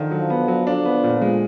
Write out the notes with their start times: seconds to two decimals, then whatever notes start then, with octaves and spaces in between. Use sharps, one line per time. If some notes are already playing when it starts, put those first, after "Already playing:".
Already playing: D3 D#3 F3
0.11 F#3
0.30 B3
0.48 F#3
0.66 D3 F3 D4
0.85 B3
1.03 A#2
1.22 G#3